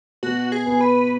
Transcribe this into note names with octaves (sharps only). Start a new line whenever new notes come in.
B2 F#4
G#4
B3
B4